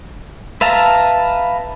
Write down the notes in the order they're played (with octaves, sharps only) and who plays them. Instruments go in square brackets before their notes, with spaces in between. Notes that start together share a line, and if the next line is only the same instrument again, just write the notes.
[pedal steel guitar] B4 E5 F5 A5 A#5